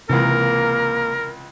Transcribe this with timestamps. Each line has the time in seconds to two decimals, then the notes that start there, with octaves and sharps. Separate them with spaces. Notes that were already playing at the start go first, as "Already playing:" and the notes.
0.09 C#2 C3 E3 A#3 A#4